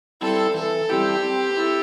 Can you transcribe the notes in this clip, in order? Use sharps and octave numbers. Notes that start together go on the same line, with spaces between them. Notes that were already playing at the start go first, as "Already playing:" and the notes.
G3 C4 E4 A4
E3 A4
G3 C4 E4 G4
C4
E4 A4